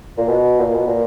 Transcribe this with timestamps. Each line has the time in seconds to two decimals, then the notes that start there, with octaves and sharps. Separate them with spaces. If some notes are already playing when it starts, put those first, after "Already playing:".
0.17 A#2
0.28 B2
0.59 A#2
0.74 B2
0.87 A#2